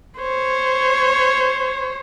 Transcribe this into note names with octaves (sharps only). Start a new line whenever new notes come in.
C5 C#5